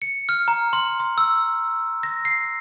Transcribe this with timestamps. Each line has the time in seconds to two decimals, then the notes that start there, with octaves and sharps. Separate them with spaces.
0.02 C#7
0.29 F6
0.48 A#5
0.73 C6
1.00 C6
1.18 E6
2.03 A#6
2.25 C7